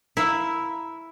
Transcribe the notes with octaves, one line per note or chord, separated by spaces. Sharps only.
E4 A#4 E5 F5